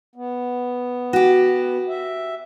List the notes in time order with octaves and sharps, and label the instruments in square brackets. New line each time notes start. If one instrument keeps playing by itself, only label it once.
[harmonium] B3
[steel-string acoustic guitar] F#4 G4
[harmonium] E5